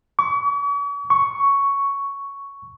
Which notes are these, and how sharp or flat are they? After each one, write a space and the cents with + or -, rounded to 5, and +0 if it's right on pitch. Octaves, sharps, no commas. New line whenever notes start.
C#6 +45
C#6 +5